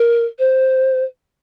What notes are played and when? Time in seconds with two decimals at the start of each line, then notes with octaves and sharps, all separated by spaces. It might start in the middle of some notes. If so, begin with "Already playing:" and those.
Already playing: A#4
0.39 C5